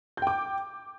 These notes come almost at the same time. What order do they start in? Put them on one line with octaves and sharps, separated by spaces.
G6 G5 D6